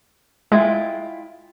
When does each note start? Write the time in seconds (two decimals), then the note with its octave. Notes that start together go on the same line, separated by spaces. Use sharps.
0.52 G#3 E4 F4 G5